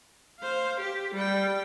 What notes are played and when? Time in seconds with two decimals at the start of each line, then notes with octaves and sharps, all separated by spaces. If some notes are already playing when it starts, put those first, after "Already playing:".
0.40 C5 F5
0.79 G4
1.14 G3 G5